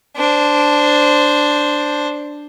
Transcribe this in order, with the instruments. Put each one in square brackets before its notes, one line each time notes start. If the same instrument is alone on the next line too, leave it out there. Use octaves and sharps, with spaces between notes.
[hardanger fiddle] D4 C5